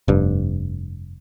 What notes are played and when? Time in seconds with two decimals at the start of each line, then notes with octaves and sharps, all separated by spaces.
0.08 F1 G2